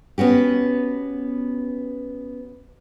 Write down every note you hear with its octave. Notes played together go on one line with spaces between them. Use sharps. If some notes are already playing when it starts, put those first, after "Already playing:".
B3 C#4 F#4 G4